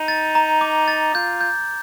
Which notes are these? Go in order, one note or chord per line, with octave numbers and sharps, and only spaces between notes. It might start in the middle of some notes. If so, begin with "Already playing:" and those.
Already playing: D#4
A6
A#5
D6
A6
F4 G6
G6